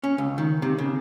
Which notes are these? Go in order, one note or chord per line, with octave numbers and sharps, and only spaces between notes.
C#4
C#2
D#3
C3
C#3